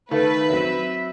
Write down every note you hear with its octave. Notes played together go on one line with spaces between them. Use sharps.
D#3 A3 A4 B4 F5
F#3 C4 E5